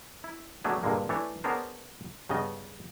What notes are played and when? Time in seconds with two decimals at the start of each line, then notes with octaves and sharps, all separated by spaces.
0.24 E4
0.64 F#3 A3 B3 D4 G#4
0.83 G2 A#2 D3 G#3 A#3
1.09 E3 A3 D4 C#5
1.44 B3 C#4 D4 G#4 A#4 C5
2.29 G2 C#3 B3 D#5